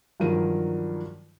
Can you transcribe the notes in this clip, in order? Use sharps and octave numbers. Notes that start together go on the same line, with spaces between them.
G2 D#3 F3 F#3 A#4 D#7